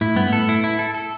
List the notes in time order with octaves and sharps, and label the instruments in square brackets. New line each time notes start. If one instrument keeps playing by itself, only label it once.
[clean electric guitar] A2 [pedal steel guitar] E4
[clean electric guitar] G2 [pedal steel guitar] B3
[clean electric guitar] A2
[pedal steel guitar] A4
E4
E4
A4
A4